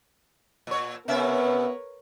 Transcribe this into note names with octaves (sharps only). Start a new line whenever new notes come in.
A#2 C#5
C3 B3 C#4 A#4 B4 C#5 E5